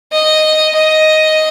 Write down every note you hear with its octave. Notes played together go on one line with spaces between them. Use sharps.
D#5
D#5